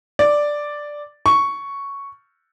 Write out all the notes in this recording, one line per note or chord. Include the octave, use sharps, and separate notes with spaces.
D5
C#6